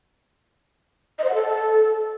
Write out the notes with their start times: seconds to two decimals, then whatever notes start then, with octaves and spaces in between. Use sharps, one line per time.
1.19 D#5
1.24 C5
1.29 F#5
1.34 A4